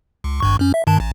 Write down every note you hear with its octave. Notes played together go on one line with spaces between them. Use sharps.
C#2
G#1 G2 C#6
F#2 C#4
E5
G2 D#3 A5
A1